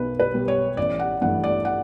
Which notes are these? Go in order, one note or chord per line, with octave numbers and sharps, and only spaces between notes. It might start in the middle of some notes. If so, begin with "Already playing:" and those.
Already playing: B1 B2 B4
B4
B2 G3
C#5
A1 D5
F#5
G2 E3 A3 F#5
D5
F#5